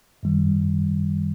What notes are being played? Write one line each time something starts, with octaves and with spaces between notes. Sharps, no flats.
F#2 D#3 G3